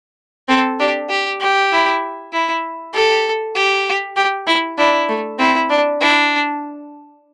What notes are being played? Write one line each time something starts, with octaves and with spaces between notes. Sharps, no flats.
C4 A4
D4 G4
G4
G4
E4
E4
G4 A4
G4
G4
E4
D4 E4
A3
C4 E4
D4
D4 E4